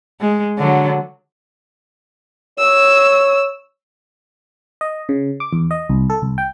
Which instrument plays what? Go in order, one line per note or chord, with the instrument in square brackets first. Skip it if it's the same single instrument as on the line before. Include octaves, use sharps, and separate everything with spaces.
[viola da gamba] G#3
D3 F#3
[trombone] C#5 [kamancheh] E6
[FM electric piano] D#5
C#3
D6
E2
D#5
C2
A4
C2
G5